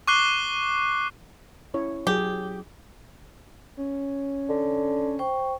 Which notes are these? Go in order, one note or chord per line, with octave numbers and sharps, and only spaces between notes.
C#6 D6 F#6 C7 G7
C#4 E4 C#5
F#3 G4 G#4
C#4
D3
C5 G5 C#6